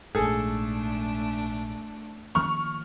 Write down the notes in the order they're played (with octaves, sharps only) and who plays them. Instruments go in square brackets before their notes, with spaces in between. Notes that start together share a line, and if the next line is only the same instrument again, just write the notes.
[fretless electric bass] A#1 G#2 [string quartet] A3 D4 [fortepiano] G#4 A4
[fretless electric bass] D#3 F3 A#3 [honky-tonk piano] C#6 F6